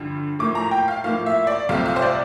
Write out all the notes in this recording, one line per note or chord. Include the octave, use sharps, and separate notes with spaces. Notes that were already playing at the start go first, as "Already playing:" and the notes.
Already playing: G2 D3 F3
A2 F3 A#3 D6
A#5
G5
F5
A2 F3 A#3 F5
E5
D5
C2 C3 F3 A3 F5
F5
C5
D5